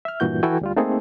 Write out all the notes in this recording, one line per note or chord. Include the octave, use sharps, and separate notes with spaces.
E5 F6
G2 A#2 E3 F#4 G6
E3 E4 F#4 A4 G5 G#5
D2 G3 F4
A3 A#3 C4 D#4 G#4 A4